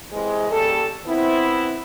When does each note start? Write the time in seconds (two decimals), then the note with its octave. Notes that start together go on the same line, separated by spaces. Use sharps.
0.12 C3 E3 G#3
0.50 C#3 G3 A#3 G4 A4
1.07 B3 C4 E4